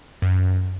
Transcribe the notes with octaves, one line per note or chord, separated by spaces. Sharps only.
F#2